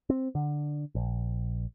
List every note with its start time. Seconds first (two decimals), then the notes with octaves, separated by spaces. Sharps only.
0.10 C4
0.35 D3
0.95 A#1